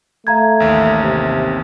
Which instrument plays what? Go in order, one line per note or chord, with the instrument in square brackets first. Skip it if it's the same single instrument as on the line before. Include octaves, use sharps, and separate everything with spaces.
[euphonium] A3 [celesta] F5 A#5 G#6
[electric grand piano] A1 D#2
[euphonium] C3